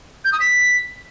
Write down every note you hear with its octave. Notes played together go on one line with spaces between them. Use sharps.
G6
D#6
B6